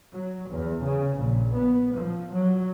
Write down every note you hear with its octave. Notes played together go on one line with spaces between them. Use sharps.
F#3
E2
C#3
A#1
B3
F3
F#3